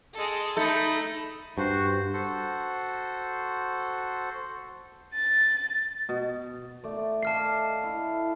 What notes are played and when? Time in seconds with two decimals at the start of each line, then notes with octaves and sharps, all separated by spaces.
0.13 G#3 A4
0.57 A3 D#4 A4 B5
1.58 G2 F#4 C5
2.14 F#4 A4 C5
5.14 A6
6.09 B2
6.84 A3 D5
7.23 D5 D#5 F5 A5 F6 C7
7.84 E4